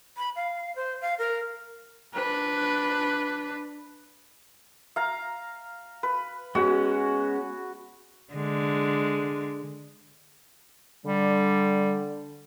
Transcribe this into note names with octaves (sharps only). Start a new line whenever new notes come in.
B5
F5
C5
F5
A#4
D4 B4
F5 A#5
B4
G#3 B3 C#4 F#4
D3 G#3
D3 G3